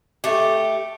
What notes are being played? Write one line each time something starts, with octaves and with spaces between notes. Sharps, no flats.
A3 G4